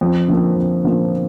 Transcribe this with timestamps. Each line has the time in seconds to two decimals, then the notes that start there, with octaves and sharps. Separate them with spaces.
0.01 F2
0.28 D3 F3 A#3
0.56 F2
0.84 D3 F3 A#3